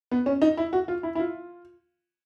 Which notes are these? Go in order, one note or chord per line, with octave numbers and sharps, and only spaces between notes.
B3
C#4
D#4
E4
F#4
F4
E4
E4
F4